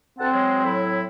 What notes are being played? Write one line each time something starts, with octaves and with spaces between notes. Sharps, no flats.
D2 C4 F#5 A5
F#3 G#3
A2 F#3 E4